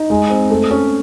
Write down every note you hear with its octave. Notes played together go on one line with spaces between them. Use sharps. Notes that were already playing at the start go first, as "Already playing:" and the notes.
Already playing: D#4
G#3
C4
A3
C#4